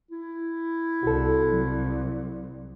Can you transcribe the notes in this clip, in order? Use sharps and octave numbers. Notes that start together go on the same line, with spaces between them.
E4
C2 F#4 A4
F#3